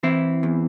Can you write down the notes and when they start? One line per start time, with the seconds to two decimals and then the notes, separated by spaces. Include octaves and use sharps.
0.03 E3 C4 E4
0.43 E2